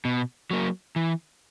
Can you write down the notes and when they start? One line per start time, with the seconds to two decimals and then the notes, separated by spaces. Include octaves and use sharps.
0.05 B2
0.51 F#3 A#3
0.96 E3